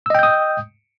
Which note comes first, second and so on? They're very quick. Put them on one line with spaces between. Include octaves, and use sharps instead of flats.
E6 D#5 G5 G6 D#6